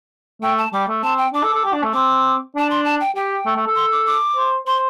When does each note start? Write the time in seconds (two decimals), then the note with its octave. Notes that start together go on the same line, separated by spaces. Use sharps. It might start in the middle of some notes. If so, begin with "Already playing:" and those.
0.42 A3 G5
0.58 A5
0.73 G3 D6
0.88 A3
1.03 C4 A5
1.18 G5
1.33 D4 D6
1.43 A4
1.54 A4
1.64 G4
1.73 D4
1.84 A3
1.94 C4 D6
2.55 D4 A5
2.70 C6
2.85 A5
3.01 G5
3.16 G4 G5
3.46 A3
3.56 A3
3.67 A4
3.76 C6
3.92 D6
4.06 D6
4.36 C5
4.67 C5 C6